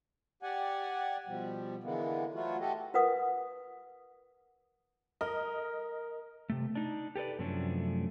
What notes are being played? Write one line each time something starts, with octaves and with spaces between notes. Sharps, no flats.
G4 D5 F#5 G#5
B2 F3 G3
D3 E3 G#3 A#3 B3
F#3 A3 B3 F4 F#4
F#4 G4 A4 D#5
F4 A#4 B4 F#5 D#6
A#4 D#5
C3 A3
D4 D#4
G4 A4 B4 D5
F#2 C3 F3 A3 C#4 D4